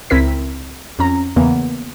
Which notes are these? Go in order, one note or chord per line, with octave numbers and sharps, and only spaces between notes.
C#2 C4 E4 A#4 B6
F2 C#4 A#5
E2 C#3 E3 A#3 B3